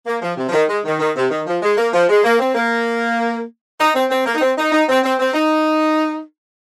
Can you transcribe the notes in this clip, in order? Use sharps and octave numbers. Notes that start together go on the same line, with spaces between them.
A#3
F3
C3
F3
D#3
G#3
D#3
D#3
C3
D#3
F3
G#3
A#3
F3
G#3
A#3
C4
A#3
D#4
C4
C4
A#3
D#4
C4
D#4
D#4
C4
C4
C4
D#4